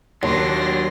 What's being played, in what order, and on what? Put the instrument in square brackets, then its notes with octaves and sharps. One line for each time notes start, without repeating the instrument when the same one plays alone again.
[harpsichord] D#2 [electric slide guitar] F#3 D4 [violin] C6 A#6